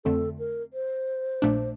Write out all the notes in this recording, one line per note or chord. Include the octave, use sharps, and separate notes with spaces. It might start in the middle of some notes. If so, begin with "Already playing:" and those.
F2 D3 A3 C4 A4
A#4
C5
A#1 A#2 A3 D4